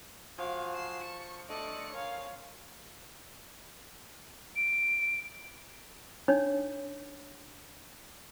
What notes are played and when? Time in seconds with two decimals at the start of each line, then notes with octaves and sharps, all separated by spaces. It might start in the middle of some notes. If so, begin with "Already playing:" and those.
0.38 F3 F#4 F5 G#5
0.74 C7 E7
1.04 A5 C#6
1.49 A3 D4 A4 D5 D#5 C#7
1.94 A#4 C#5 F5 G#5
4.56 D7
6.28 D4 D#4 C#5